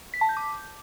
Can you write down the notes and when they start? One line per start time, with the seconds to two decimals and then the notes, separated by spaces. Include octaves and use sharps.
0.14 B6
0.21 A5
0.29 G6
0.37 D6